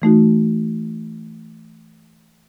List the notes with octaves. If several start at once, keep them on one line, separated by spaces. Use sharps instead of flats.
E3 A3 D#4 F#4